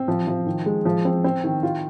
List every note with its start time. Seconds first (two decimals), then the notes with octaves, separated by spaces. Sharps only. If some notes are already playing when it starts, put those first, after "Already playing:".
Already playing: C4
0.08 F3
0.27 F3
0.46 D#3
0.66 G#3
0.85 F3
1.05 C4
1.24 C4
1.44 D#3
1.63 F4